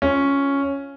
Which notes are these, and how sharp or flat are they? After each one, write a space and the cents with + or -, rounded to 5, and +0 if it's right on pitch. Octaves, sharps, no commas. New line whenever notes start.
C#4 +0 F4 +0